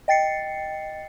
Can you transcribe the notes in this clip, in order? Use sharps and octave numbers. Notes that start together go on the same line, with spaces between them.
D#5 G5 A6 C7 C#7